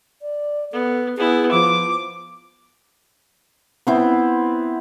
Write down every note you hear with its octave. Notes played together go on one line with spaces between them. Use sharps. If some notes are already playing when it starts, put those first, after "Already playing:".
D5
B3 A4
B3 E4 G#4
F3 D6
B3 C4 E4